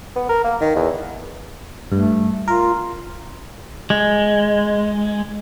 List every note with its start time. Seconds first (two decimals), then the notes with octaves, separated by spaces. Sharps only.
0.16 B3
0.29 A#4
0.44 A#3
0.61 D#3
0.76 E2
1.92 G2 A3
2.48 F4 A#4
3.90 G#3